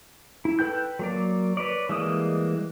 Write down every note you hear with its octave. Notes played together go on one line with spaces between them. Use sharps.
E4
A4 B4 G5 G6
F#3 A#3 D5
B4 C#5 D5
E3 G3 G#3 A#3 D#6